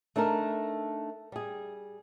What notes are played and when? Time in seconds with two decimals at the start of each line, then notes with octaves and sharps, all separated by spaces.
0.16 A3 D4 D#4 A4 A#4
1.32 G3 G#4